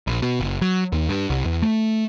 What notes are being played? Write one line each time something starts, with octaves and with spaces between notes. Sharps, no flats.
A#1
B2
F#1
F#3
D#2
G2
C2
E2
A3